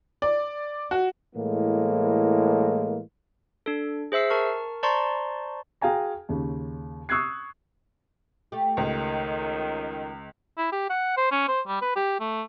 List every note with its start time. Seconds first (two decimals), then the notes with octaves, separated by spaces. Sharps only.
0.22 D5
0.91 F#4
1.35 A2 E3 G#3 A#3
3.66 D4 A4
4.12 G#4 C5 E5 E6 C7
4.30 A#4 A5 C#6 F6
4.83 C5 D5 A5 A#5 C6 C#6
5.81 F#4 G#4 F5 G5 G#5 A#5
6.29 D#2 C#3
7.09 C#6 D#6 E6 F#6 G#6 C7
8.52 A3 G4
8.77 C#2 D#3
10.58 E4
10.72 G4
10.90 F#5
11.17 C5
11.31 C#4
11.48 C5
11.68 G3
11.82 B4
11.96 G4
12.20 A3